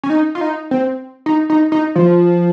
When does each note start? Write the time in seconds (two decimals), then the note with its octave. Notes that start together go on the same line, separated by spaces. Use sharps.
0.03 C#4
0.10 D#4
0.35 F4
0.41 D#4
0.71 C4
1.26 D#4
1.50 D#4
1.72 D#4
1.96 F3